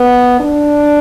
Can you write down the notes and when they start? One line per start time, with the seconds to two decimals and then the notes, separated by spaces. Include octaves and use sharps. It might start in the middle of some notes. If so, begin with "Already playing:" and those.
Already playing: B3
0.40 D4